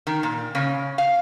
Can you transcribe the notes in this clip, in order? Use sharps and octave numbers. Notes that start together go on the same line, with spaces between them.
D#3
A#2
C#3 C#4
F5